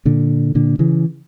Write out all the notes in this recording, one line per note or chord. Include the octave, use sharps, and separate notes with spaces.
A#2 D3
A#2 D3
C#3 E3